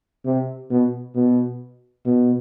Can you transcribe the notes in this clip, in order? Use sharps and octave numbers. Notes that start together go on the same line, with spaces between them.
C3
B2
B2
B2